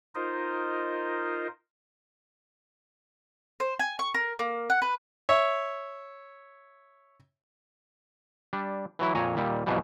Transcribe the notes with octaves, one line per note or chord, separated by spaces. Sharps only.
D#4 F4 A#4 C5 D#5
C5
G#5
C#6
A#4
A#3
F#5
B4
C#5 E5
G3 D4
E3 F#3 E4
F2 A#2 C#5 G#5 A#5
D#2 A#2 G3
B1 F2 G#2 B2 E3 G3